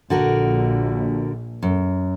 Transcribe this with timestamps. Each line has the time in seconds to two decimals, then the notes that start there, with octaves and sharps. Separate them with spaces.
0.10 A#1 D3 F#4 A#4
1.63 F#2